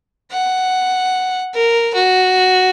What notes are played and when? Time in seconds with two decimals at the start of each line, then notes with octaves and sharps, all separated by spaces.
0.32 F#5
1.55 A#4
1.95 F#4